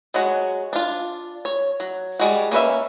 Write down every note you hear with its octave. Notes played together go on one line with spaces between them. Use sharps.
F#3 G#3 F#4
D4 F4
C#5
F#3
G3 G#3 F#4
A#3 C#4 B4 E5